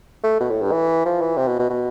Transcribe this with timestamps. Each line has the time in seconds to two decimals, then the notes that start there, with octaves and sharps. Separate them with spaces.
0.23 A3
0.41 B2
0.51 A2
0.62 G2
0.72 E3
1.05 F3
1.21 E3
1.37 C3
1.48 B2
1.59 B2
1.70 B2